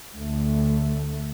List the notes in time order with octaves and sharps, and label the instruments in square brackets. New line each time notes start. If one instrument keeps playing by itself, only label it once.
[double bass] D2 A3